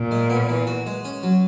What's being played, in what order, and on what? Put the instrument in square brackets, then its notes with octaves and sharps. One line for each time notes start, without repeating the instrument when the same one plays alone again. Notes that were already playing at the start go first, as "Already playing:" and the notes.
Already playing: [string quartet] A#2
[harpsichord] G#3
B3
E3
F#4
G#3
C#4
F#3